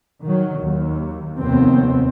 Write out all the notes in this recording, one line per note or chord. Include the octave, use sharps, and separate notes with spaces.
D#3 F#3
D#2
F1 D#2 B3 C4